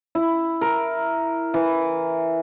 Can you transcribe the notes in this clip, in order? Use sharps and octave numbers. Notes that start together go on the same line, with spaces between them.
E4
A#4
E3